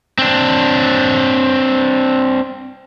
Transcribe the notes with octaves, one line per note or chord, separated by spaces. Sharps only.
C4 D4